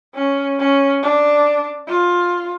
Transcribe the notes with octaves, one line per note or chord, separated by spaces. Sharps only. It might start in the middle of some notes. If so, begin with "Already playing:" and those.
C#4
C#4
D4
F4